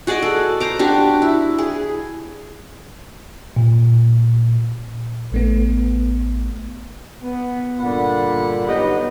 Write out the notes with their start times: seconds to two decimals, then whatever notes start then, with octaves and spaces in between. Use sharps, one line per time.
0.07 F#4 G#4 D5 D#5
0.22 A4
0.60 C5 A#5 D6
0.79 D4 F#4 G4
1.22 E4
1.58 G#4
3.56 A#2
5.32 A1 A3 B3
7.22 B3
7.80 G2 A#2 D3 F#5 B5
8.67 F#3 B3 D#4 G4 B4 D#5